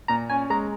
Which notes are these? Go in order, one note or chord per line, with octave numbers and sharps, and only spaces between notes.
A#2 A#5
C#4 G#5
G#3 A#5